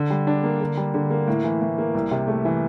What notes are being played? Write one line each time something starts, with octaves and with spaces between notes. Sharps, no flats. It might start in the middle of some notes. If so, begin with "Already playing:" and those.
Already playing: D3
G3
D4
A#3
D3
G3
D3
A#3
A2
E3
A2
A#3
C2
C3
A3
E3